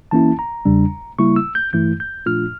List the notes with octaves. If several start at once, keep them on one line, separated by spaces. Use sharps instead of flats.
E3 A#3 C#4 E4 A5
A#5
E2 C#3 G3 D4
C#3 G3 A#3 E4 C#6
E6
G6
G2 E3 A3 E4 G6
G6
A#2 F3 A3 D4 F4 F6